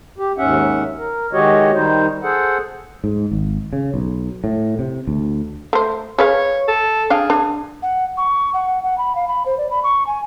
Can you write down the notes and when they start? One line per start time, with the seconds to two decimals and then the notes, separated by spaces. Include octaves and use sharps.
0.18 G4
0.38 D#2 G#2 C#4 E5 F#5
0.98 A#4
1.33 D#3 G#3 F#4 G4 C#5 D#5
1.75 D#3 G3 D#4 C5
2.23 G#4 A4 C5 F#5
3.04 G#2
3.32 G#1
3.73 C#3
3.94 B1
4.44 A2
4.79 C3
5.07 D2
5.73 A3 C5
6.18 G#4 B4 C#5 F5
6.68 A4
7.10 D4 G#4 F5 G5
7.30 D4
7.82 F#5
8.17 C#6
8.54 F#5
8.83 F#5
8.98 B5
9.16 F5
9.28 B5
9.46 C5
9.58 D5
9.71 B5
9.84 C#6
10.07 G#5